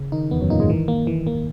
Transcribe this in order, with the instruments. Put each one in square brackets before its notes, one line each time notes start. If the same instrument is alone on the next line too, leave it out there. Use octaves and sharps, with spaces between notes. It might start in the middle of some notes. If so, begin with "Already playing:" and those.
Already playing: [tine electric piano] C#3
[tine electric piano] D#3 [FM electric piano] D#4
[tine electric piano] E2 E3 [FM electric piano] B3
[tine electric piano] F#2 F#3
[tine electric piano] A#2 A#3 [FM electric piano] D#4
[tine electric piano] G#2 G#3
[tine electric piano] D#3 [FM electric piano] E3
[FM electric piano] A#3
E3
A#3